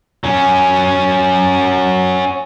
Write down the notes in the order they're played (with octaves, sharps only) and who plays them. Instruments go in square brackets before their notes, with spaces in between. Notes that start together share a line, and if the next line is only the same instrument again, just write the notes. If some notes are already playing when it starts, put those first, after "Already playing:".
[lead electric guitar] F#3 C#4